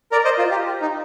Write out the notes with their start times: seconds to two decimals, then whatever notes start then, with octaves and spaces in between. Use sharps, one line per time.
0.12 A#4 D5
0.25 C5 D#5
0.38 F4
0.51 G4
0.81 D#4